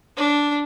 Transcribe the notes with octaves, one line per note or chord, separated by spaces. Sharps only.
D4